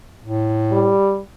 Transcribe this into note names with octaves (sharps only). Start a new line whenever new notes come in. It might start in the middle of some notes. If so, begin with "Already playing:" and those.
A2
G3